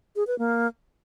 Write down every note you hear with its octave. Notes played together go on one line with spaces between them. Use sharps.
G#4
B4
A#3